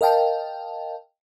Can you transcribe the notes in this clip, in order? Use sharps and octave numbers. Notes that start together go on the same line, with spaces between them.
A#4 D#5 F5 G5 A5